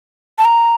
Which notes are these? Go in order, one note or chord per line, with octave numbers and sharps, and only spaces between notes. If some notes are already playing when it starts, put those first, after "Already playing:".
A5
A#5